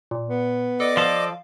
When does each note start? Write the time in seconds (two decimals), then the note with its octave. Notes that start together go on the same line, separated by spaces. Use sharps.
0.11 A#2
0.28 B3
0.80 A4 D5 D#5 D6
0.97 F3 A4 F5